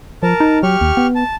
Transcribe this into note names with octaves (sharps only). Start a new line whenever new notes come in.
F3 A#4 A5
D#4
F#3 G4 C#6 F6
D#2
B3
A5